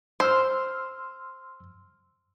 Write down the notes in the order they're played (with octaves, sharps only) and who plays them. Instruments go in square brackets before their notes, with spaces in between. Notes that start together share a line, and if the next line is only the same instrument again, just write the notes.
[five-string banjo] C5 [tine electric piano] C6 E6 F6